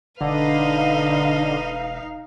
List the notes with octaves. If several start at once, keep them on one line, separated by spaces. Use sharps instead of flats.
E1 D3 D#4 B4 D#5 F5